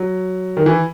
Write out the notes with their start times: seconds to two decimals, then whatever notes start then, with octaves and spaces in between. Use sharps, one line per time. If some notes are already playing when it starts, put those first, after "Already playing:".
Already playing: F#3
0.57 D#3
0.66 E3